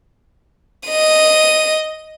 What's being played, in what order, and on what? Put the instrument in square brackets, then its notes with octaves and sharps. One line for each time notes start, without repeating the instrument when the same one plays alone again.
[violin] D#5 D#7